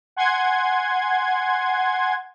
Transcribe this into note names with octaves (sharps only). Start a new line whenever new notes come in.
F#5 G#5 C6 G#6